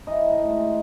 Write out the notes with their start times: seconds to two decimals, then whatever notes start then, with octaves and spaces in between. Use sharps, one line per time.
0.07 E3 D#4 D#5
0.29 A2
0.49 G#3